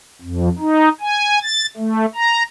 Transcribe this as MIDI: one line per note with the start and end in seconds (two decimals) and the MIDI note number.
0.21 0.49 41
0.59 0.89 63
1.01 1.39 80
1.43 1.66 93
1.77 2.06 57
2.14 2.43 82